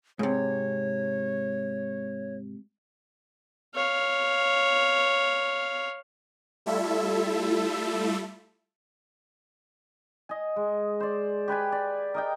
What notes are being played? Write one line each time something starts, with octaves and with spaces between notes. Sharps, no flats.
G#2 C3 C#5
C#5 F5
G3 A3 E4 F4 A4 E5
D#5 G#5
G#3
C5 D5
G4 B4 G5 G#5
D5
A#4 D#5 G5